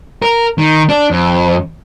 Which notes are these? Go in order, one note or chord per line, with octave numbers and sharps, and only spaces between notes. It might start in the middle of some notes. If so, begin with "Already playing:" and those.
A#4
D#3
D4
F2